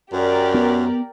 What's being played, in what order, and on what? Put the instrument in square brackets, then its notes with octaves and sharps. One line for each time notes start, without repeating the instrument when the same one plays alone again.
[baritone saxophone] F#2 [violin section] G4 A#4 D5
[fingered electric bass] B3